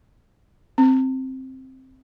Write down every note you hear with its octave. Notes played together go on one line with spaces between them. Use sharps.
C4